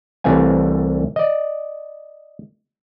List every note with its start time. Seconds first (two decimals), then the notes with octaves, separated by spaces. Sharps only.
0.24 C2 E3 A3 C4 F5 G#5
1.16 D5 D#5